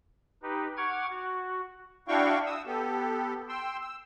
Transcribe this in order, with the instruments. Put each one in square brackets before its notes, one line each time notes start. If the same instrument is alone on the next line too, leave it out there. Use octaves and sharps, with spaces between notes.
[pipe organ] D#4 G4 B4
F#5 C#6 D6 F6 G#6
F#4
[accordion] D4 E4 F#4 F5 G5 C#6
D#6 E6
B3 G4 A4
G5 C6 E6
E6